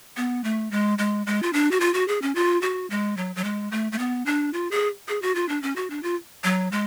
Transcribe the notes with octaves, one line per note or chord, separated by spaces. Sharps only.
B3
A3
G#3
G#3
G#3
F4
D4
F#4
F4
F#4
G#4
C#4
F4
F#4
G#3
F#3
F#3
G#3
A3
A3
B3
D4
F4
G#4
G#4
F#4
F4
D4
C#4
F#4
D4
F4
F#3
G#3